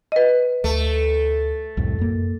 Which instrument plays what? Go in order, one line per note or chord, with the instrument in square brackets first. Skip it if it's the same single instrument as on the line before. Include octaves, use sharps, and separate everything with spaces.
[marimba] B4 D#5
[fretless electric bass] D2 [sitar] A3
[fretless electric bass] C2 F2 A2
F#2 A#3